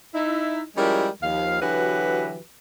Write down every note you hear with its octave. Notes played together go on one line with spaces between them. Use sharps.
D#4 E4
F3 G3 G#3 C#4 E4 A#4
D#2 F3 F5
D3 E3 F#3 F#4 G4 B4